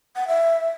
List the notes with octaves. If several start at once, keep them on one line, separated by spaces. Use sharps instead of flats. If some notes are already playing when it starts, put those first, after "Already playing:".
F#5
E5